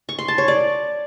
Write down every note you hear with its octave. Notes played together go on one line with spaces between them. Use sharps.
C#6
C6
A5
C#5
D5